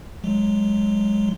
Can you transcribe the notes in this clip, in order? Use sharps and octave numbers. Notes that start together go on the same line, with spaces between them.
F#3 G#3